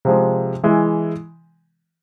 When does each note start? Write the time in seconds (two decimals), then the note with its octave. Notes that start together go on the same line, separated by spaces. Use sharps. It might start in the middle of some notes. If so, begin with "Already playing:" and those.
0.05 C3 F3 G#3
0.63 E3 G#3 E4